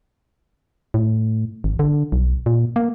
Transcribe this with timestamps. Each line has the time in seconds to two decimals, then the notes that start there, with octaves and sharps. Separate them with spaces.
0.94 A2
1.64 G#1
1.79 D3
2.12 B1
2.46 A#2
2.76 A#3